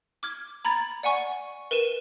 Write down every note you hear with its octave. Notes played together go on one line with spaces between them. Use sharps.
D6 F6 G#6
A#5 B5 G#6 A6
D5 F#5 G#5 C#6
A#4 B4 D#7 E7